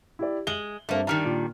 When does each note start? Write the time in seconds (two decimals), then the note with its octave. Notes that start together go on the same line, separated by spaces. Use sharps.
0.19 E4 G4 D5
0.47 G#3 F#7 G7
0.89 G2 A3 A#3 C4
1.07 D#3 G3 D4 A#5 F6 F7
1.25 A#2